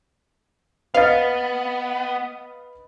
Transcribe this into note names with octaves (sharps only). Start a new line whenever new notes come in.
B3 B4 D#5 F5 A6